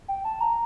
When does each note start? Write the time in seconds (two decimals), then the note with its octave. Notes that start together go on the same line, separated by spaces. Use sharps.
0.08 G5
0.25 A5
0.41 A#5